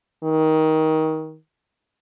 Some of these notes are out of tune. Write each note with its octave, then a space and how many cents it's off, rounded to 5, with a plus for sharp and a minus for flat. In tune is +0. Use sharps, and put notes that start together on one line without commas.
D#3 +20